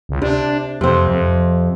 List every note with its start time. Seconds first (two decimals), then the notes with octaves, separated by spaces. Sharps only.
0.09 C#2
0.22 C3 D4
0.81 F2 C3 C4
1.08 F2